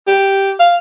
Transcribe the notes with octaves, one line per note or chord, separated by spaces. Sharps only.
G4
F5